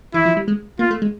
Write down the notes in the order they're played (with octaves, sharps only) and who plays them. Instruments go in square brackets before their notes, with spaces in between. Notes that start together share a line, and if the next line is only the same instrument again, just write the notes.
[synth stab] E3 [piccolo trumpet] E4
[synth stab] F3
G3
G#3
[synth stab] A#3 [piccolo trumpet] F4
[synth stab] A3
G#3